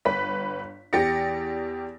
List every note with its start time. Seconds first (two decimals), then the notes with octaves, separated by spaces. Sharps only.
0.05 G1 B4 B6
0.93 E2 G4 A6 A#6 C#7